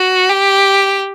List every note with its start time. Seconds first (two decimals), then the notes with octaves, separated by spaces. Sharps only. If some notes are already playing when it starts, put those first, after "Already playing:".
Already playing: F#4
0.30 G4